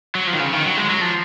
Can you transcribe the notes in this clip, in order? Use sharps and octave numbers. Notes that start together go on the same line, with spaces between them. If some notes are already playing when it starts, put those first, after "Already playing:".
F#3
F3
D#3
C#3
D#3
F#3
G#3
F#3
F3